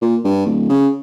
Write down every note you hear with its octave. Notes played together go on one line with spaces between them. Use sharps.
A#2
G2
D1
C#3